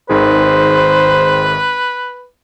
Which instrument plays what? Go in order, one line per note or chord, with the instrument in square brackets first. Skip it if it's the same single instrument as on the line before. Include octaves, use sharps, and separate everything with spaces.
[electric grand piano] G#1 D#3 G#4 [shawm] B4 [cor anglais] C5